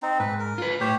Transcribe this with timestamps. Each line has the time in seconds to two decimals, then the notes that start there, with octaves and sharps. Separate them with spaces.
0.02 C4 D#4
0.20 G#2 B4
0.39 A#4
0.58 F4 B4
0.81 A2 G4 C5 C#5